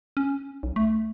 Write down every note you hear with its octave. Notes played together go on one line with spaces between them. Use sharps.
C#4
B1
A3